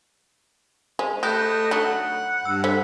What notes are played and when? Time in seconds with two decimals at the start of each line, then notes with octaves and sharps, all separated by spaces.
0.99 G#3 C5
1.23 A3 G4 D#5 B5 F#6 G6
1.71 D3 F#3 D#4 F#5
2.45 G2 E6
2.64 D3 C5 B5